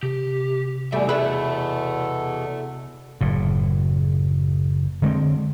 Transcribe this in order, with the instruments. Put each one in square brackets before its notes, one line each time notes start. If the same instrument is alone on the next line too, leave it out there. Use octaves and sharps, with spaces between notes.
[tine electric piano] C3 [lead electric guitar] G4
[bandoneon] E2 B2 [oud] G3 A3 [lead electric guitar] E5 G#5
[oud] E4 G#4 B4 [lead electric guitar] A4 E5
[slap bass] F#1 A2
D3 G#3 C4